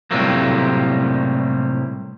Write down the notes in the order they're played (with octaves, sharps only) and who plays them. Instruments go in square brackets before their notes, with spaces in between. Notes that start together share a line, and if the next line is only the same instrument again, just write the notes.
[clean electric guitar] A2 C3 F#3 G3 A3 A#3